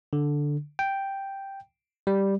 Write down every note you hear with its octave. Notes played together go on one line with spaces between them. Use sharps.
D3
G5
G3